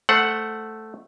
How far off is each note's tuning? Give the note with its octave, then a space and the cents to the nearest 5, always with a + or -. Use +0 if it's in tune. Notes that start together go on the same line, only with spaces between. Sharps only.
A3 +0 C5 +0 F#5 +0